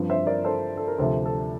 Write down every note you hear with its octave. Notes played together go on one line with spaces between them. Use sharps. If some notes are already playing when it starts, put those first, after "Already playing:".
Already playing: G2 F3 C4
C5 E5
A#4 D5
A4 C5
A4
A#4
D2 C3 F3 A4 C5
A4